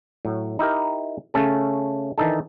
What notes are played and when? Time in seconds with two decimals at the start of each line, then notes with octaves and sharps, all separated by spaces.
0.25 A2 F#3
0.59 D#4 E4 G4 A#4
1.34 C#3 A3 C#4 A4
2.18 D#3 E3 D4 D#4 A4